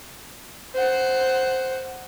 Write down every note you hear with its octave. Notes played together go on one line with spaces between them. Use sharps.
C5 F#5